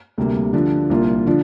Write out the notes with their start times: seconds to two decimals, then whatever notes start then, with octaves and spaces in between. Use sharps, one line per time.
0.18 D2 C3 G3 A#3
0.53 D3 F3 D4
0.90 C2 A#2 A#3 F4
1.27 D3 F3 D4